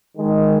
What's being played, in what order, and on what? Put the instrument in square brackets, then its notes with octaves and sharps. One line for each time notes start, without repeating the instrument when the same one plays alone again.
[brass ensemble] D#3 G#3